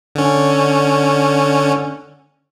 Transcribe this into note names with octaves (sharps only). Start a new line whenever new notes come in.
D3 C#4